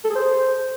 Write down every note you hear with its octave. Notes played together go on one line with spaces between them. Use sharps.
A4
G#4
C5